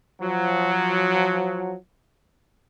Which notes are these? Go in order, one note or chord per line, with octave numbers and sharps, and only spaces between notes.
F3 F#3